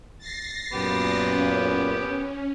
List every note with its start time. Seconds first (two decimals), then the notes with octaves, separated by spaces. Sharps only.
0.18 A6 A#6 C7
0.73 F#2 A#2 B3 G4
1.29 C#4